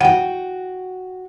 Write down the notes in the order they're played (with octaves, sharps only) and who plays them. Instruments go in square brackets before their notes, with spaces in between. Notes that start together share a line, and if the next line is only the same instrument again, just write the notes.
[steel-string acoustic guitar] F#4 G5 [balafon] F#5